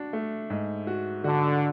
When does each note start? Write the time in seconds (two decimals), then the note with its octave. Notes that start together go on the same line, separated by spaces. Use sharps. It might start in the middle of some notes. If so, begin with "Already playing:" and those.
Already playing: D4 F#4
0.13 A3
0.50 G#2
0.87 F#4
1.24 D3 F#4